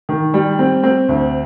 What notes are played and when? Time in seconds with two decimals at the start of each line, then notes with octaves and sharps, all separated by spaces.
0.09 D#3
0.34 G3
0.59 C4
0.83 C4
1.09 D2